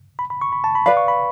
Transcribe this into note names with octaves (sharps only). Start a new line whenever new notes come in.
B5
B5
C#6
B5
A5
B5
B4 D5 F5 B5
C#6
B5